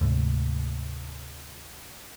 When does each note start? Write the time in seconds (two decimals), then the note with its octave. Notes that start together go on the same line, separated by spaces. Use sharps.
0.01 D2 G#2 C3